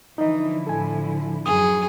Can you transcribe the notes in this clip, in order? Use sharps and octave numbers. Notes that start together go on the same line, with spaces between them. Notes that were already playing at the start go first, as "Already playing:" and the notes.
D3 E3 F3 D#4 E4 D#5
A2 A4 G#5
F#2 G#4 D#6